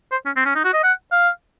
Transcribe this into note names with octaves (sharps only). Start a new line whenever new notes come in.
C5
C#4
C4
C#4
D#4
F#4
D#5
F#5
F5